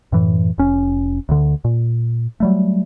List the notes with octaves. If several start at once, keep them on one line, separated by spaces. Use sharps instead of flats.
F#2 A2 E3
F1 C#4
D2 D3
A#2
F#3 G3 A3